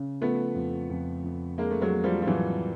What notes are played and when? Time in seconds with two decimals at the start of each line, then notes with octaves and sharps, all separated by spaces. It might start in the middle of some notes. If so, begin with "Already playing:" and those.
Already playing: C#3
0.21 F3 A3 B3
0.55 F2
0.90 F2
1.24 F2
1.58 G#3 A#3 D4
1.71 A3
1.81 F#3 G#3
1.93 A#3
2.04 F3 G3
2.22 F3
2.27 A2 E3 F#3